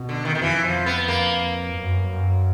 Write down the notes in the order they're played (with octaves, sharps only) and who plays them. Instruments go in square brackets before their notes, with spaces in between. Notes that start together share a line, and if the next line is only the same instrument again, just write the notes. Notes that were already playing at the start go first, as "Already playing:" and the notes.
Already playing: [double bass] B2
[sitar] D3
D#3
D#3
[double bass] F2 [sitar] E3
[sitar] F3
B3
[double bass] F2 [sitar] A#3
[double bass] F#2
F#2